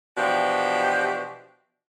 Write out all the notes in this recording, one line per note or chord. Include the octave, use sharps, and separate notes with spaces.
B2 E3 F3 D4 G4